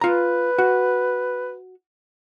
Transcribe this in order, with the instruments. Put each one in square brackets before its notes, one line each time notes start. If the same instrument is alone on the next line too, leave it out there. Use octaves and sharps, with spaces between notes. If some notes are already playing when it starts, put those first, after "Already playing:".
[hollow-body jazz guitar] F4 A#5 [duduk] B4
[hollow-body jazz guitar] F#4